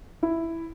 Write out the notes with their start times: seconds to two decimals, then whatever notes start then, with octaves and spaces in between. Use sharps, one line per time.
0.23 E4